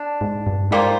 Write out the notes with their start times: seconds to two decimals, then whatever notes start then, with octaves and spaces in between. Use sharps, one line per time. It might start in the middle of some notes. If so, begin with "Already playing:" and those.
Already playing: D4
0.21 G#2
0.47 G2
0.71 G#2 G3 A#3 F4 C5